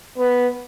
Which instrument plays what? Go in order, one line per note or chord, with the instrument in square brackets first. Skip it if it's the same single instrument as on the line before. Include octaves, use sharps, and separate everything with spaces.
[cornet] B3